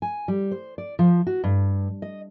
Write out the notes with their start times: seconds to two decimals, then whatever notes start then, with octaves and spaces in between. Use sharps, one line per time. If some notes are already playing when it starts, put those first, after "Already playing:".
0.02 G#5
0.28 G3
0.51 C5
0.78 D5
0.99 F3
1.27 F#4
1.44 G2
2.02 D#5